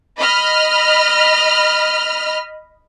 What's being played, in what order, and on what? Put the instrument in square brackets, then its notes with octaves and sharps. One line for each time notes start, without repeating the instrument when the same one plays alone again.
[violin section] D#5 B5 F6